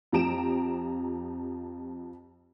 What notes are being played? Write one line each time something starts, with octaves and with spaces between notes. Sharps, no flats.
F2 F3 G4 A#5 D7 E7